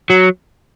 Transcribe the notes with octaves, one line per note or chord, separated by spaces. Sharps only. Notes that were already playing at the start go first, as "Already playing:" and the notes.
F#3